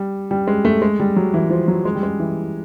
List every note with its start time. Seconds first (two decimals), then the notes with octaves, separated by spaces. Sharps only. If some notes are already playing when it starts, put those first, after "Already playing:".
Already playing: G3
0.31 G3
0.47 G#3
0.65 A3
0.82 G#3
1.00 G3
1.16 F#3
1.34 E3
1.51 F3
1.68 F#3
1.85 G#3
1.95 G3
2.03 G#3
2.19 E3